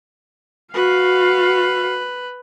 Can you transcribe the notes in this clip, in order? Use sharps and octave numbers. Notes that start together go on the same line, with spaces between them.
F#4 B4 F5